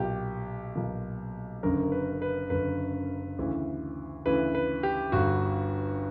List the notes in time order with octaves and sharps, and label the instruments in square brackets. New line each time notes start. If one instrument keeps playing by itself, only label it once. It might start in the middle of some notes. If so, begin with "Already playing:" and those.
Already playing: [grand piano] B1 A#2 G4
B1 A#2
F#1 F#2 D3 A#4
B4
B4
F#1 F#2 D3 B4
D2 C#3 E3
D2 C#3 E3 B4
B4
G4
G1 G2 D3 F#4